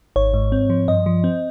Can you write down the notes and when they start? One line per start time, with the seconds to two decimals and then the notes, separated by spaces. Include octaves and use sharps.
0.16 G#1 C#5
0.34 G#2
0.52 C4
0.70 F3
0.88 G2 D#5
1.06 F3
1.24 C4